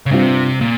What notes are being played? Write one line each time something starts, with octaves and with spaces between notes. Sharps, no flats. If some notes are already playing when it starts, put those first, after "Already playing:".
C#3
G2 C3 G3 C4 F4
A#2